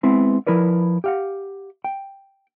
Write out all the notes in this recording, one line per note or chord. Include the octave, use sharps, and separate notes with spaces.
G#3 B3 C4 E4
F3 E4 A#4 B4 D5
G4 F5 F#5
G5